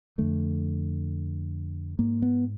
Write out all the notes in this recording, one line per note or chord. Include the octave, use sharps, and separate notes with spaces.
F2 D3 A3
G#2 A#3
B3